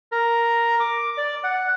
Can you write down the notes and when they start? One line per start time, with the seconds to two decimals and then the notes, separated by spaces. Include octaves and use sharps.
0.12 A#4
0.80 D6
1.18 D5
1.44 F#5